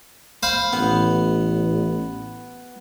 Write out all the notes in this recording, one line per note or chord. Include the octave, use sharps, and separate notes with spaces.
C5 F5 B5
A1 B3